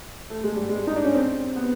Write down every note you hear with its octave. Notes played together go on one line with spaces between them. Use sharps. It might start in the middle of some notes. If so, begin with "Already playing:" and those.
A3
G#3
G3
G#3
D#4
D4
C#4
C4
B3